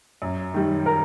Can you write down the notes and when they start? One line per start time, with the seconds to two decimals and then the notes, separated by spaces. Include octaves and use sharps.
0.22 F#2
0.54 D#3 G3
0.86 A#4